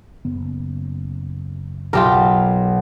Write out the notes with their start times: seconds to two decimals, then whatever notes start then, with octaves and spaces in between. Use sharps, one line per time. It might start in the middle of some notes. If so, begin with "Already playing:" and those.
0.25 F#1 B3
1.93 B1 F4 G4 A#4